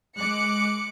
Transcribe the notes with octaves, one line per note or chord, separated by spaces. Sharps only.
G#3 D6 F#6 C#7